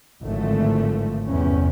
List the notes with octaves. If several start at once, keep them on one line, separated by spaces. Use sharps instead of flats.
G#1 A2 D3 F3 A3
G1 E2 C3 C#4